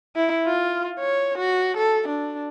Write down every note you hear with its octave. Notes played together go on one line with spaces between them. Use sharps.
E4
F4
C#5
F#4
A4
D4